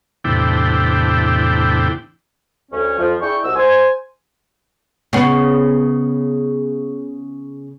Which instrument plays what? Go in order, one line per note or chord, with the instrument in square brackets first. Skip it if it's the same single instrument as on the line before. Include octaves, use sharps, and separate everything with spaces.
[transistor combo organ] E2 A2 C3 D4 E4 G5
[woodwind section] D2 C#4
F2 F3
D4 E4 G#4 G5 C#6
C2 F#4 D#5 E6
C5 G#5
[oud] C#3 B3